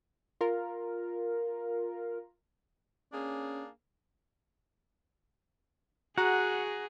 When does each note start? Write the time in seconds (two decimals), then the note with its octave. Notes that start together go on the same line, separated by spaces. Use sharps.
0.41 F4 A#4
3.13 A#3 C#4 D4 G#4
6.18 F#4 G#4 F#5 A#5